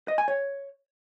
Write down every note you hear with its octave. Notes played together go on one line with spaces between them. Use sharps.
D#5
G#5
C#5